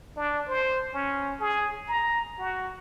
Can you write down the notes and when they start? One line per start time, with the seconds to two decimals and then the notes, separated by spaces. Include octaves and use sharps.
0.16 D4
0.48 C5
0.94 C#4
1.40 G#4
1.88 A#5
2.39 F#4